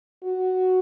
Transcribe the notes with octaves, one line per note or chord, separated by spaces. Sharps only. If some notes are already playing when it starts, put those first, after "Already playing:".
F#4